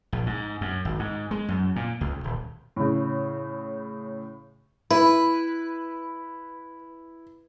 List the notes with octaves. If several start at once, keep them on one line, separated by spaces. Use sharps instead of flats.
A#1
G#2
F#2
G#1
G#2
G#3
F#2
A#2
C#2
D#1
A2 C#3
E4 B4